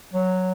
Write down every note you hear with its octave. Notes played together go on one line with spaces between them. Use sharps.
F#3